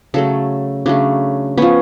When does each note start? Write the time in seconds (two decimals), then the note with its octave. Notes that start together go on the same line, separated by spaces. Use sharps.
0.14 C#3 F#3 A3 A4
0.86 C#3 F#3 A3 D4
1.57 F3 B3 C#4